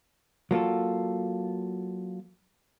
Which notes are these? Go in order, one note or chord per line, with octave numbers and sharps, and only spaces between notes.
F#3 A#3 F4 A4